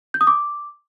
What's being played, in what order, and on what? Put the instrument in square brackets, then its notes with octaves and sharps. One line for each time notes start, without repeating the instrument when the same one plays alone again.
[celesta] G6
D#6
D6